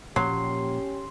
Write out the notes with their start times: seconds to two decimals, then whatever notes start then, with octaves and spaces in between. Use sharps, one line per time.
0.16 A#2 F3 F#3 A#3 C#4 G4 C6